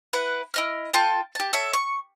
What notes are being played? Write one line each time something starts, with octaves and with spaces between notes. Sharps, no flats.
E4 B4 F#5
E4 D#5 F6
F4 A4 G5 A5
G4 A5
A4 C#5 E5
C#6